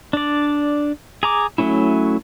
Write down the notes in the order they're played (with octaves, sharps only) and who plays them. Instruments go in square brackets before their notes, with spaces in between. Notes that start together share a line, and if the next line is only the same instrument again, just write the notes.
[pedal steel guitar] D4 D5
G#4 A#5 D6
F#3 A3 C#4 E4